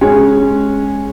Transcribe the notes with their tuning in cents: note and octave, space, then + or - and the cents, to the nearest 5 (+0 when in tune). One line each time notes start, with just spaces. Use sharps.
G#3 +0 C#4 -10